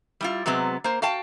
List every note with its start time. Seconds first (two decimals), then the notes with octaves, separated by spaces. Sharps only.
0.21 G3 E4 F4
0.46 C3 F#3 G#3 B3 C4
0.84 A#3 C5
1.02 F#4 F5 G5 A5